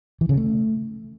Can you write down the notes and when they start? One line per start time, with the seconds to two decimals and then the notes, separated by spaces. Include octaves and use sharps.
0.21 E3
0.29 C#3
0.37 A3